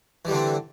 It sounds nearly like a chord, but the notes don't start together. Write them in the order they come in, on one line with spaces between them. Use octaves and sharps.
E3 G3 D3 C4